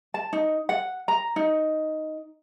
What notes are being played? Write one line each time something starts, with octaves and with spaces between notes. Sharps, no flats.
A5
D#4
F#5
A#5
D#4